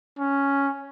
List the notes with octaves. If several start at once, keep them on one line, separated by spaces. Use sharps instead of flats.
C#4